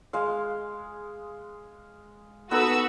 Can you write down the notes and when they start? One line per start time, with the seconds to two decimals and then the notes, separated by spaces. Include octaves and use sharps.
0.13 G#3 F5
2.51 B3 D#4 F#4 A4 B4 E6